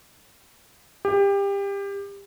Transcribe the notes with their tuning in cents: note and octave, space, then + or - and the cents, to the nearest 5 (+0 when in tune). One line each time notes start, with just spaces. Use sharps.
G4 +25